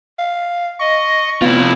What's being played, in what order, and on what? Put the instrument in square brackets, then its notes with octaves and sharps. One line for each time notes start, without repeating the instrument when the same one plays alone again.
[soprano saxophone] F5
[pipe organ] D#5 [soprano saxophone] C#6
[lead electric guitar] C3 F4 [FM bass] B3 [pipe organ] E4